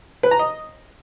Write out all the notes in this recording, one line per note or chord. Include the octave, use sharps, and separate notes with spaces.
B4
A#5
D#5